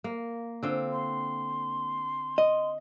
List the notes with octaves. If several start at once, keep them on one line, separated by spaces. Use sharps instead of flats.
A#3
D3 C4 F4
C6
D#5